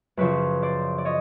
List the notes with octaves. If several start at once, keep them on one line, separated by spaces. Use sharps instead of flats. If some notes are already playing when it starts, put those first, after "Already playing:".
F#2 C#3 F3 B4 C#5
C5 D5
D5
C#5 D#5